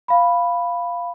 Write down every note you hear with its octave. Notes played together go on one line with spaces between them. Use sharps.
F5 B5